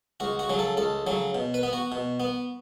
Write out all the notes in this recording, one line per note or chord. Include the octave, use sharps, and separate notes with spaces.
C#2 F#4
F#4
C#3 F#3
A4
C#2 A4
C#3 F#3
B2
B4
B3
F#4
B2
B3